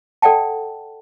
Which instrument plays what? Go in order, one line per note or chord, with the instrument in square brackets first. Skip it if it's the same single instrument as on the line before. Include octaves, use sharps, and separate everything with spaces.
[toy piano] A4 D5 F#5 G5 A5